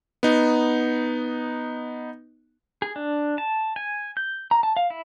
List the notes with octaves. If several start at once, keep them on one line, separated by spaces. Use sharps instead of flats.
B3 D#4
G#4
D4
A5
G#5
G6
A#5
A5
F5
E4